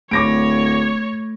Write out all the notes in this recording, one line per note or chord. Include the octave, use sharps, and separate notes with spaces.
D1 A3 C#5 D6 A#6 D7